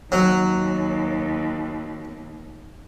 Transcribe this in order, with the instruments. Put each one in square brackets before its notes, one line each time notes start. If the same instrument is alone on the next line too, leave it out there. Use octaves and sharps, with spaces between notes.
[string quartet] D#2 [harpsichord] F#3